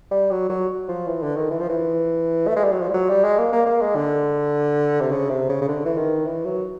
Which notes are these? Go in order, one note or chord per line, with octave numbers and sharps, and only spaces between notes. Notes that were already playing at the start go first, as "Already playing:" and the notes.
G3
F#3
F#3
F3
E3
D3
D#3
E3
F3
E3
A3
G#3
G3
F#3
F3
G3
F#3
G3
G#3
A#3
A#3
A#3
G#3
D3
C3
C#3
C3
C#3
C#3
D3
E3
D#3
E3
F#3